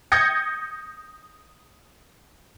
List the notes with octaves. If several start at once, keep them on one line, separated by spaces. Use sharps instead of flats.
D#6 G6 G#6 A#6 C#7